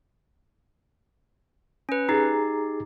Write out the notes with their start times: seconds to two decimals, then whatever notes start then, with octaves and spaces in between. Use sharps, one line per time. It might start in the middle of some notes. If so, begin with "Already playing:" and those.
1.89 C#4 B4
2.09 D#4 G4 G#4 A#5